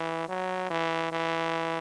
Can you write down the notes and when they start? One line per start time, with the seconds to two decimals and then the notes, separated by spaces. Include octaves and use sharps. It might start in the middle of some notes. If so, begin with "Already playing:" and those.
Already playing: E3
0.28 F#3
0.70 E3
1.12 E3